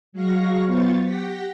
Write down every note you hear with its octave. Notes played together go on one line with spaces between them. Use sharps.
F#3 G#3 F#4 F5 C#6 A#6
F#3 B3 F4 C5 C#6 A6
G4 F#5 G5 A#6 B6